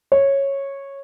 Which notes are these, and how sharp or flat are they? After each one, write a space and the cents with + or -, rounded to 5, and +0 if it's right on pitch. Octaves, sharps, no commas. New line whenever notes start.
C#5 -10